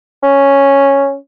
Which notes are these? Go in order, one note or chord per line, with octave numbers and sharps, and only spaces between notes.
C#4